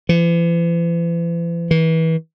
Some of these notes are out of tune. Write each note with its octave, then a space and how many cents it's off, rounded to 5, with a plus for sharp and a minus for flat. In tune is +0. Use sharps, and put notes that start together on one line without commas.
E3 +45
E3 -30